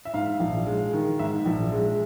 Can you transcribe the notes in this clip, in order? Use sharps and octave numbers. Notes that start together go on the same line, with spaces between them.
E5
G#2 F5
A#1
G#3
D#3
G#2 E5
A#1
G#3